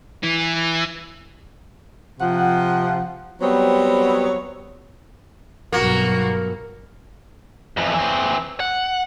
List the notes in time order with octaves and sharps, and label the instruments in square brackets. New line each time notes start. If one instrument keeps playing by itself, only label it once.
[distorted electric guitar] E3
[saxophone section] C3 F3 F#5
F#3 G3 B3 C4 C5 C#5
[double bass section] B1 G2 F#3 [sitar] A#3 [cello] F#4
[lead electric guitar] F2 E3
E3 C4
F#5